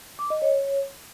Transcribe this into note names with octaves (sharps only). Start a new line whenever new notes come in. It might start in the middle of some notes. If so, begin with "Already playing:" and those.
D6
D#5
C#5